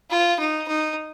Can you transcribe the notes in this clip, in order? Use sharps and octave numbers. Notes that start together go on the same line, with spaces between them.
F4
D#4
D#4